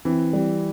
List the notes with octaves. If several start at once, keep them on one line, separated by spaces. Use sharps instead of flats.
E3 C4
G3